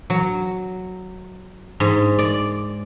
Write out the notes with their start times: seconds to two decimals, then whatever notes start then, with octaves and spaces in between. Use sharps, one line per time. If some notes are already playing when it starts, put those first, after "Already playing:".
0.10 F#3
1.80 G#2
2.19 D5